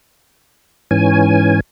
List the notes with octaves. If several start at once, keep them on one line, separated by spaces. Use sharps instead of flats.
G#2 E3 C#4 G#5